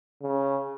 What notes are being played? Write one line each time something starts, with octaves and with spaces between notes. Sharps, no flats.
C#3